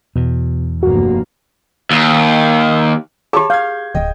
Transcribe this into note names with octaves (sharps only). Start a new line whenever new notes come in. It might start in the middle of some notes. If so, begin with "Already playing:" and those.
E2 B2
F1 G2 A#3 F#4
D#2
G4 G#4 C#5 A5 B5
F5 G6 G#6
D1 D#5 G5